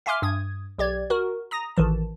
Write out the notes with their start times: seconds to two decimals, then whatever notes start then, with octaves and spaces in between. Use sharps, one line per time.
0.06 E5 F5 G#5 C6 D6 F6
0.22 G2 D#6 G#6
0.79 B1 G4 D5 G#6
1.10 F#4 A#4
1.51 A#5 D#6 A#6
1.77 A1 D#3 E3 A5